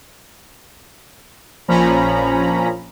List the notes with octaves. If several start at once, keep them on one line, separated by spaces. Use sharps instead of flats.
A#1 A#2 F3 C#4 A#5 B5